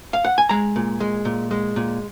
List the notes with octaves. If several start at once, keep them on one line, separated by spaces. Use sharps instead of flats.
F5
F#5
G#5
G#3 A#5
A#2
G#3
A#2
G#3
A#2